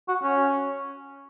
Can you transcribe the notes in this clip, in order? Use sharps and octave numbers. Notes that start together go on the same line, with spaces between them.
F#4
C#4